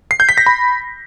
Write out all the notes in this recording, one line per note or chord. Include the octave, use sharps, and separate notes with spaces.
C7
G6
B6
A#6
B5